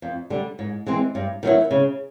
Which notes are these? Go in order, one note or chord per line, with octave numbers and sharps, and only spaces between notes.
F2
D3 G3
G#2
E3 G#3 C4
G2
D#3 F#3 B3 E4
C#3